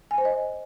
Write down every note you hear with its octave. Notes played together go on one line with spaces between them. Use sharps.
G#5
C5
D#5